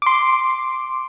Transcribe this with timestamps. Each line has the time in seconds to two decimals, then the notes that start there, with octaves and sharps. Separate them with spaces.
0.02 C6 D6